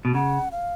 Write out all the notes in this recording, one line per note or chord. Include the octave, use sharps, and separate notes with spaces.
B2
C#3 F#5
F5